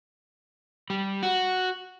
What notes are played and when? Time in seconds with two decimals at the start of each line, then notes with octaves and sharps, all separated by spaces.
0.90 G3
1.23 F#4